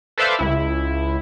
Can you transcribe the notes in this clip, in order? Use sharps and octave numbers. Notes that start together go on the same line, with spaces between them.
A4 B4 C5 D5 E5 F5
C#2 E4